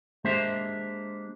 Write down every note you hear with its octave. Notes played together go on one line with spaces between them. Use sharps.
G#3 A#3 D4 G4 C5 E5